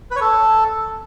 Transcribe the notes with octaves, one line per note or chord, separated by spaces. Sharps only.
B4
C#5
A4